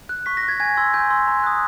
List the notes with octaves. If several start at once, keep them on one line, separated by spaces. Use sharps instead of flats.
F#6
C#6 B6
A#6
F#6
G#6
G#5 G#6
C6 E6
G#5 G6
C6 E6
A#5
D#6 F#6